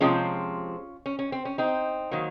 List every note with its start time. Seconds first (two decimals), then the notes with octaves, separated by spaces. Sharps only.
0.01 C3 F3 G#3 C4 C#4 F4
1.06 C#4
1.19 C#4
1.32 C4
1.45 C#4
1.58 C4 D#4
2.11 D#3 F#3 A#3